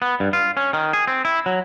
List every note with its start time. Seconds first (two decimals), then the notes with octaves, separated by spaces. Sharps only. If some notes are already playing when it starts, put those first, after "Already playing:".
0.02 B3
0.20 G2
0.33 F4
0.57 C#4
0.73 D#3
0.93 G#4
1.08 C4
1.25 E4
1.46 F#3